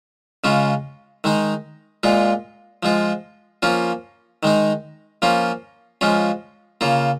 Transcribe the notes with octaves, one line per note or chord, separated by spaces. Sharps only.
C#3 G#3 C#4 F4
D#3 G#3 D#4
A#2 G#3 F4
F3 G#3 F4
F3 A#3 C#4 F4
D#3 G#3 D#4
F3 A#3 C#4 F4
F3 G#3 C#4 F4
C#3 A#3 F4